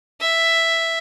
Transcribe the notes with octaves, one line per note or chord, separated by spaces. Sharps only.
E5